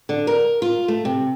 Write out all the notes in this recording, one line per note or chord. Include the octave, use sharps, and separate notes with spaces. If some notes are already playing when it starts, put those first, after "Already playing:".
D3
A#4
F4
A3
C3